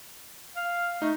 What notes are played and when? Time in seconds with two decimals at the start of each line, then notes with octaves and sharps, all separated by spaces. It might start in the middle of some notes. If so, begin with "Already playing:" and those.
0.56 F5
1.02 A3 D#4